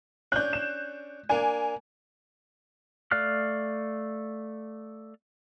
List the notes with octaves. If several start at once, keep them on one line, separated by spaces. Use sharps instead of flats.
C#4 D4 F#6 G6
E7
A#3 D4 G#5
A3 D5 F5 F6 F#6